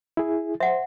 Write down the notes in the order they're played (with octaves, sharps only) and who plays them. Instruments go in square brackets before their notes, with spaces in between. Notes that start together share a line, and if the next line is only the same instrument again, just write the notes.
[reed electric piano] E4 G#4
[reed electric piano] C5 [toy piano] E5 F#5